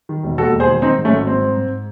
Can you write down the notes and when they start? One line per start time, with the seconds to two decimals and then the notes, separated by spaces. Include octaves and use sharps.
0.09 D#3
0.23 E1
0.37 D#2 F#4 A4
0.53 E1
0.60 G#4 C5
0.68 D#3
0.82 D#3 C4 D#4
0.98 G#2
1.05 A3 C#4
1.12 G#1
1.26 G#2 C4
1.42 G#2
1.56 G#2